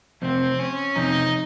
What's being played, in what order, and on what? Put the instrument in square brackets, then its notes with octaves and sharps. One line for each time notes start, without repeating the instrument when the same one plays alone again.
[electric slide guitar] F2 C3 [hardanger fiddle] C4
[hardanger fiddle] C#4
[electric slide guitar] F2 C3 [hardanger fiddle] D#4